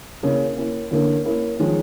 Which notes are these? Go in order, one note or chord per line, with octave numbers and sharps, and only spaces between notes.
C#3 A#3 C#4 E4
A#3 C#4 E4
D3 A#3 C#4 E4
A#3 C#4 E4
D#3 F3 G#3 C#4